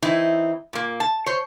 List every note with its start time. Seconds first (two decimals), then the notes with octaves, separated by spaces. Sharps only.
0.02 E3 C4 D#4 E4
0.73 A#2 A#3
1.00 A5
1.26 C5 C#5